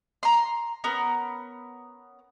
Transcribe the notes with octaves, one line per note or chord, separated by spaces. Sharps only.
A#5 C6
B3 C#4 A#4